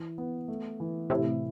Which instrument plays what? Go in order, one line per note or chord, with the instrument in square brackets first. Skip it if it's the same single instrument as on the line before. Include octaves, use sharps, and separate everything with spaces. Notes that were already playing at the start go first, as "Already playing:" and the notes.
Already playing: [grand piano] E3 E4
B3
A3
E3
[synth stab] A2 C3 [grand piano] E4